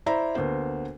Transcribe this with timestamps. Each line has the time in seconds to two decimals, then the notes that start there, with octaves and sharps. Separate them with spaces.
0.06 E4 C5 D5 E5 A#5 B5
0.35 D2 A#3 B3 C5